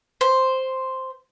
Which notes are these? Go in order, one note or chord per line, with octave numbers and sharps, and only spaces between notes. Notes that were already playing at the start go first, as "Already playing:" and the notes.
C5